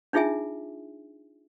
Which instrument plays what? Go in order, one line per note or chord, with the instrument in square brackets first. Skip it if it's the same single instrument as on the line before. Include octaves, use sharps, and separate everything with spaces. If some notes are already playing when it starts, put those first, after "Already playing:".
[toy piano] D4 D#4 F4 G#4 E5 G#5